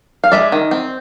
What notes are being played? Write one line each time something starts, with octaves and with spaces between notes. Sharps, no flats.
F5
G#3 D5 E5
D#3
C4